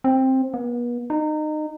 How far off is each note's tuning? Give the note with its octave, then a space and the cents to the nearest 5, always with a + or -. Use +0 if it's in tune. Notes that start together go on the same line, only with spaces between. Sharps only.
C4 +10
B3 -40
D#4 -25